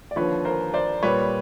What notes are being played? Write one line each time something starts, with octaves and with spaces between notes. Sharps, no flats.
D5
D#2 D3 F3 B4 C#5
A#4 C5
C5 D5
A#2 G3 B4 C#5